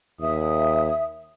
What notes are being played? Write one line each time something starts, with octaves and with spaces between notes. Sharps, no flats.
D#2 E5 D#6